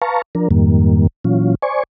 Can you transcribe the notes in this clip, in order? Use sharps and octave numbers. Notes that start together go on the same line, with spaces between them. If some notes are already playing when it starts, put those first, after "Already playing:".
B4 F5 A5 A#5 C#6
F3 D4 A#4
F2 G#2 D#3 G3 A#3
A#2 E3 F#3 C#4 F4
C5 D5 G#5 C#6